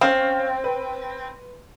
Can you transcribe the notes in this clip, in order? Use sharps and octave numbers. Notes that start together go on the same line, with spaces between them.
C4 C#4 F5
B4